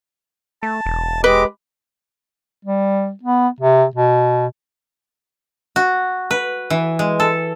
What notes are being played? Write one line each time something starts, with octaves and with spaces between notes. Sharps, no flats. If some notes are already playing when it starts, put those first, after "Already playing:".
A3 A5
E1
G#3 G4 B4 D#5 D6
G3
B3
C3
B2
F#4
B4
E3
G#3
A4